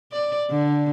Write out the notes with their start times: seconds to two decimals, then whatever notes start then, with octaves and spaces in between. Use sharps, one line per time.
0.12 D5
0.50 D3